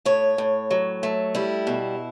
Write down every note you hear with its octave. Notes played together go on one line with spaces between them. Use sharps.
A2 C#5
A2
F#3
A3
G3 E4
B2